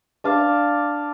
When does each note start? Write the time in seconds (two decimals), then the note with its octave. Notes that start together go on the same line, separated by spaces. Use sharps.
0.24 D4 F5 D6